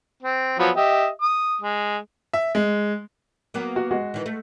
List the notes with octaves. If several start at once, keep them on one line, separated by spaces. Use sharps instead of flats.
C4
F3 F#3 B3
G4 D#5 E5
D#6
G#3
E5
G#3
F#3 A#3 B3
F#4
G#3 F#4
D#3 E3
A3